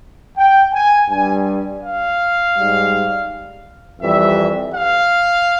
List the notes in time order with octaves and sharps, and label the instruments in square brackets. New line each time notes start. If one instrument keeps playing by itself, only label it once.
[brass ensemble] G5
G#5
G2 G3 G#5
F5
G#2 G3
F2 E3 G3 E5
F5